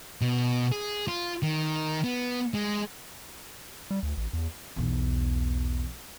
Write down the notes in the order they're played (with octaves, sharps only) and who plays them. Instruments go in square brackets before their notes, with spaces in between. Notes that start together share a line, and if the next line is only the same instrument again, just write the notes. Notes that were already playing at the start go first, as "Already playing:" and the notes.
[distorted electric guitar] B2
G#4
F4
D#3
B3
G#3
[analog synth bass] G3
D2
A1
E2
[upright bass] B1 E2